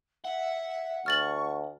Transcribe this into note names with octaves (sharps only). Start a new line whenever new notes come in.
E5 F#5
D2 C#6 F6 A6 F#7